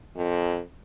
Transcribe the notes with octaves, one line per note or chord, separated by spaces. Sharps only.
F2